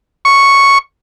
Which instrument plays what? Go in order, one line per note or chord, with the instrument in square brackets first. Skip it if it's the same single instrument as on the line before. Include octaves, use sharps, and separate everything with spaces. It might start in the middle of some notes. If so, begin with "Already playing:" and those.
[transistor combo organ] C#6